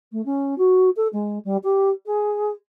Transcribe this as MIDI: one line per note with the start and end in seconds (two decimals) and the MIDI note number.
0.12 0.24 57
0.25 0.57 61
0.58 0.90 66
0.96 1.08 69
1.13 1.38 56
1.45 1.57 55
1.63 1.89 67
2.06 2.50 68